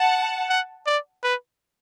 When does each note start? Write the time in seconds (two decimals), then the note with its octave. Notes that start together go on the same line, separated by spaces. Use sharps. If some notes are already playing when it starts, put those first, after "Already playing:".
Already playing: F#5 A5
0.49 F#5
0.86 D5
1.23 B4